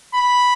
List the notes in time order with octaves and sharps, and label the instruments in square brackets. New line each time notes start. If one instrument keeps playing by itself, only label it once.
[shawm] B5